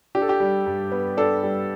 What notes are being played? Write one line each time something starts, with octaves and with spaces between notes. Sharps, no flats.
D4 G4
A4
G4
G3
G2
B3
D4 A4
G3